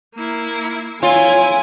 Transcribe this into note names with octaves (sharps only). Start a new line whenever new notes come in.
A#3 E4
E4 F4 C#5 G#5